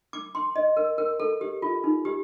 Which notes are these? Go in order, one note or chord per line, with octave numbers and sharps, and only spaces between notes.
D6
C6
D#5
A#4
A#4
A4
G4
F4
D#4
G4